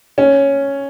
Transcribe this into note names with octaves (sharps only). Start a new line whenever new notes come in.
C#4